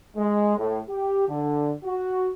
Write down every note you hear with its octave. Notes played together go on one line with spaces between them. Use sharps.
G#3
A2
G4
D3
F#4